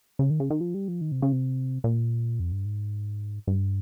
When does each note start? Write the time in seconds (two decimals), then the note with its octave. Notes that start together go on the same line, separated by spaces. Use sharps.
0.19 C#3
0.30 D#3
0.40 C#3
0.50 D#3
0.61 F3
0.74 G3
0.88 F3
1.01 D#3
1.12 C3
1.22 C#3
1.32 C3
1.84 A#2
2.40 F2
2.52 G2
2.65 G#2
3.47 G2